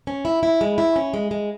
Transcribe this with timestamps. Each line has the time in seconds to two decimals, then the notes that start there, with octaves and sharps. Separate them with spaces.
0.07 C#4
0.25 E4
0.43 E4
0.61 G#3
0.78 E4
0.96 C#4
1.14 G#3
1.31 G#3